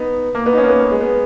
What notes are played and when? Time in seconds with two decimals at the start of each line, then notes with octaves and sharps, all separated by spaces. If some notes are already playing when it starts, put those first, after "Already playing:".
Already playing: B3 D#4
0.35 A#3
0.46 B3
0.53 D#4
0.57 C#4
0.63 A#3
0.69 B3
0.79 A#3
0.91 G#3
1.01 B3